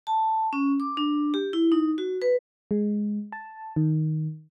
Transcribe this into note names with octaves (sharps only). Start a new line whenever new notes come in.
A5
C#4
D6
D4
G4
E4
D#4
F#4
B4
G#3
A5
D#3